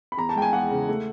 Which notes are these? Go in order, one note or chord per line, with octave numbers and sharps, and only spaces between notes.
B5
E2 A#5
A5
G#3 G5
G#5
G5
E2 F#5
C#3
A3